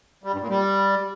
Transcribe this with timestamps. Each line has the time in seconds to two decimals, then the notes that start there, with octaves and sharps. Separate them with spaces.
0.24 G3
0.32 G2
0.41 A#2
0.49 G3